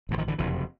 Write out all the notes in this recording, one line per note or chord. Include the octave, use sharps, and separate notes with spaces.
A1 G2 D3
D#3 F3
D3 E3
F#1 F2 C3 E3